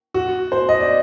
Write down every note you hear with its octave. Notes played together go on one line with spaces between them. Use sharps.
F#4
C5
D#5
D5